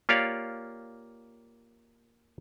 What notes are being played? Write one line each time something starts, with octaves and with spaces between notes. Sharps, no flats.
A#3 F4 G4 C#5 D5 F5